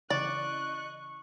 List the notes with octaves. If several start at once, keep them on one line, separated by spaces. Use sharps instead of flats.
C#3 E3 D5 D#5 C#6 F#6